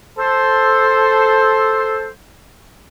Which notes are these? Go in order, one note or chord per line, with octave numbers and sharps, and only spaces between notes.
A4 C5